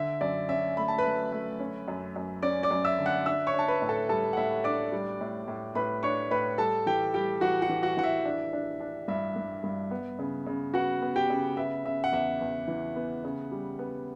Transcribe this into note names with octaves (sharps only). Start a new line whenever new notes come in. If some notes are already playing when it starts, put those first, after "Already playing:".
Already playing: D3 E5
F#2 D5
C#4 E5
A3 B5
A5
B4 B5
A3
A3
C#4
F#2
F#2
C#4 D5 D6
D5 D6
F#2
E5 E6
D3
F#5 F#6
D4 E5 E6
C#5 C#6
D4
A5
B4 B5
A2
A4 A5
G3 A4 A5
F#5
A2 E5
D4 D5 D6
G3
A2
A2
A2 B4 B5
D4 C#5 C#6
A2 B4 B5
G3 A4 A5
E3 G4 G5
G3 G4 G5
E3 F#4 F#5
F#4 F#5
E3
F#4 F#5
E3 F#5
E5
D4
D4
D4
G2 E5
G2
G2
B3
C#3
C#3
B3 F#4 F#5
B3
G4 G5
C#3
B3 E5
C#3 E5
F#5
E2 E5
E2
E3
B3
C#3
G3
B3